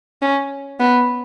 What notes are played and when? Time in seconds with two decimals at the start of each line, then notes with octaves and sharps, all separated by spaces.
0.22 C#4
0.80 B3